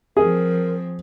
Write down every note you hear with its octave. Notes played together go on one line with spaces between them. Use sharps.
F3 C4 G#4 A#4